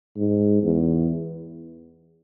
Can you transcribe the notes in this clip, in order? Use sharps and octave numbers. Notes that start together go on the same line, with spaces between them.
G#2
E2